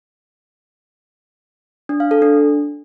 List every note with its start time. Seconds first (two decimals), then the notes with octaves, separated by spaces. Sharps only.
1.89 D4
2.00 F5
2.11 A4
2.22 D4